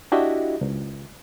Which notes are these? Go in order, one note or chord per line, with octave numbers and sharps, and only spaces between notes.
D4 E4 F#4 G4 D#5 E5
C#2